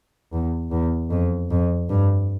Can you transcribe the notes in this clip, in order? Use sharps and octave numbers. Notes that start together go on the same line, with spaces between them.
E2
E2
F2
F2
G2